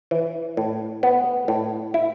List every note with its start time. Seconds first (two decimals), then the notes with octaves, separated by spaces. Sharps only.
0.11 E3
0.57 A2
1.03 B3
1.48 A2
1.94 E4